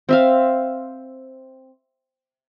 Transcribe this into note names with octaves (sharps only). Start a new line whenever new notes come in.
C4 E5 F5